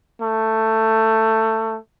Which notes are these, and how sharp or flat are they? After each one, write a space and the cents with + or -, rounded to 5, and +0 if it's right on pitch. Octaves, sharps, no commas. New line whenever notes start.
A3 +15